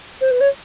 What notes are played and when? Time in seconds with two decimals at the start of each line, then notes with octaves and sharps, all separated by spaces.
0.21 C5
0.30 B4
0.40 C#5